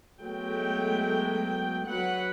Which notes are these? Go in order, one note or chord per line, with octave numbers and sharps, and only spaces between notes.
F#3 G#3 A3 B3 G5
F#3 B4 F#5